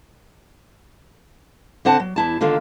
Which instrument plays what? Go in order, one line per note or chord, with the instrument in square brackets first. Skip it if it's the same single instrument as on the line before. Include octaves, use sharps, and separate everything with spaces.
[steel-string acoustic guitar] D3 C4 F#5 A5
F#3
E2 E4 A5
D3 D#3 A#3 F4 A4